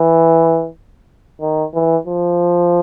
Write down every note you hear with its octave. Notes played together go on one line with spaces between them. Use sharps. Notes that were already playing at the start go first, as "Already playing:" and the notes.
Already playing: E3
D#3
E3
F3